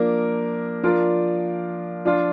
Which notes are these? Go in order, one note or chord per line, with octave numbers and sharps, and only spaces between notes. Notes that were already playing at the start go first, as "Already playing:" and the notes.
Already playing: F3 A#3 D4 A#4
F3 D4 F4 A#4 D5
F3 D4 F4